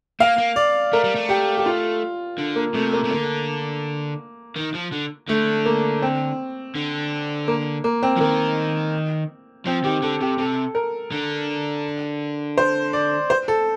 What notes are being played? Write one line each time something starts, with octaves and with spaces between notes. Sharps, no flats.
A#3 F5
A#3
D5
A3 A#4
G3
A3
G4
G4
F4
D3
A#3
C3 A3
A#3
C3
D3 A#3
D#3
F3
D3
D3 A3
A#3
C4
D3
A#3
A#3
C4
F3
D#3 A#3
F3 C4
D#3 G4
D3 A4
C3 G4
C3 A4
A#4
D3
C5
D5
C5
A4